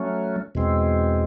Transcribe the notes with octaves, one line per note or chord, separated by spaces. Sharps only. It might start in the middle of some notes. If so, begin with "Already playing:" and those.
Already playing: F#3 A3 C#4
E2 B2 G#3 C4